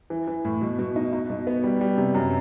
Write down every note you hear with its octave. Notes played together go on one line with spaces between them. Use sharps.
E3
E3
A2
B2
B2
D#4
D#4
B2
B3
G3
G3
C3
F#2